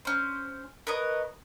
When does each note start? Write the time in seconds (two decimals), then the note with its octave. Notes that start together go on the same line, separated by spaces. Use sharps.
0.05 C#4 C5
0.87 A#4 B4 C#5 D#5